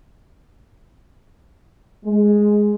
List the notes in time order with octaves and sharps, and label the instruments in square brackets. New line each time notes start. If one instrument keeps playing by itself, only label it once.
[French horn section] G#3